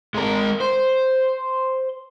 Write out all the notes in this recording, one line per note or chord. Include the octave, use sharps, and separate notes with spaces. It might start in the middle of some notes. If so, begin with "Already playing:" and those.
G#3 A#4
C5